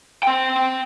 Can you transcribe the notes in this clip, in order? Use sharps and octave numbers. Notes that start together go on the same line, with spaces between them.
C4 G5